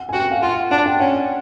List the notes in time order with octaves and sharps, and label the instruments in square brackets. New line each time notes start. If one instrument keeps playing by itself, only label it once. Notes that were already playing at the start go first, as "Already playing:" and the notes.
Already playing: [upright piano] F#5
G#5
[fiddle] F#4 [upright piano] G5
[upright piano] F5
[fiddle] F4 [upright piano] F#5
[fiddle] D4 [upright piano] F#5
[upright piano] G5
[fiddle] C#4 [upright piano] F#5